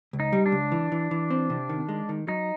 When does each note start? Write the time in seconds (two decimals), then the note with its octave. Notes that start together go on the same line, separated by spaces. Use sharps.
0.13 C#2
0.20 D#4
0.33 G3
0.46 D4
0.52 C#2
0.72 E3
0.92 E3
1.11 E3
1.30 C4
1.50 C3
1.69 D#3
1.89 G#3
2.09 D#3
2.28 F#3 D#4